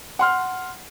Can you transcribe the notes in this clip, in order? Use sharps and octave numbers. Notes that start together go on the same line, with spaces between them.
F#5 C6 F6